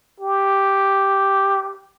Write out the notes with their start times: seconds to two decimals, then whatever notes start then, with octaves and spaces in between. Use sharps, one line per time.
0.20 G4